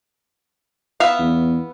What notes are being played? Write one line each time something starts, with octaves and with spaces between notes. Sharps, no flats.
B3 E5 F5
E2